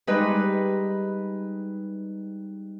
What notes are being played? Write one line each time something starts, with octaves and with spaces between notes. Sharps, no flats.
G3 G#3 D#4 B4